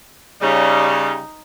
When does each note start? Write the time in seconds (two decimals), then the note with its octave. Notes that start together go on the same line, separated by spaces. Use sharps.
0.41 C#3 G3 D#4